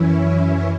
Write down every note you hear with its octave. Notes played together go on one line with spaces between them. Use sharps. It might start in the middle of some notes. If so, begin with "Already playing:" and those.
Already playing: F#2 E3 C#4 E4